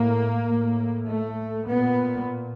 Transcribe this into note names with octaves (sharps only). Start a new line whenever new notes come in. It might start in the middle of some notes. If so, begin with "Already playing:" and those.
Already playing: A2 A#3
A2
A3
A#2 B3